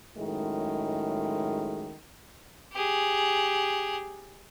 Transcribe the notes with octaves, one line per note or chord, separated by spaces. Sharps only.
F#2 A2 D#3 G#3
G4 G#4